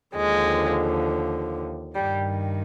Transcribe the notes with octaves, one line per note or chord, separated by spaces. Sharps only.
D#2 D3 F3 G#3
G2 D#3 G3